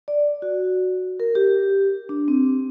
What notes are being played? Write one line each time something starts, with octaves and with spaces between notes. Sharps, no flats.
D5
F#4
A#4
G4
D4
C4